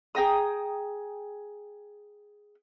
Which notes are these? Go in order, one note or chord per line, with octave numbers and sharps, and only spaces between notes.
G#4 G5 A#5 D#6